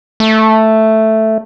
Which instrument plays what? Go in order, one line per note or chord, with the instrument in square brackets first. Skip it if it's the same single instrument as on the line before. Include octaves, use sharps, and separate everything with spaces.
[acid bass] A3